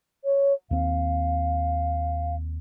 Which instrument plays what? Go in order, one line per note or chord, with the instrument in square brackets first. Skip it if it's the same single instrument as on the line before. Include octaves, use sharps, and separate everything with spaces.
[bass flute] C#5
[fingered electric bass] D#2 C4 [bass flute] F5